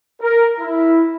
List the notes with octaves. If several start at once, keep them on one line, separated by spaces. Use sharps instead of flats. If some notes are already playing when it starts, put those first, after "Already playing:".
A#4
E4